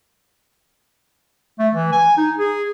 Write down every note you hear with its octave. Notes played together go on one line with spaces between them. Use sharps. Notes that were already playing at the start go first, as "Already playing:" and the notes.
A3
E3
G#5
D#4
G#4